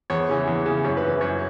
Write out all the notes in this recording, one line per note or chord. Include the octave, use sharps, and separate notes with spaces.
E2 C#5
C#3 E3
E2
C#3 E3
F#2 C#5
B4
C#3 E3
B4
F#2 C#5